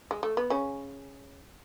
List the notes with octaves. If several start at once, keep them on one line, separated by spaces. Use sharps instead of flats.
G#3
A3
B3
C#3 C#4